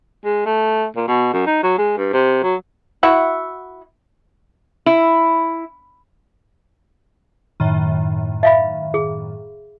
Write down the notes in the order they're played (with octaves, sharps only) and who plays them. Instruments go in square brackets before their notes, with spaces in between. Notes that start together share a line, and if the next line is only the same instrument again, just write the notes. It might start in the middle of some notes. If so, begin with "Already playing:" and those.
[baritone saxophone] G#3
A3
A#2
B2
F#2
D#4
F#3
G#3
G2
C3
F#3
[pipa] E4 F#4 E5 F#5
[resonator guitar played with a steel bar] E4
[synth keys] F#2 A2 D#3
[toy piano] E5 F5 B5
G#4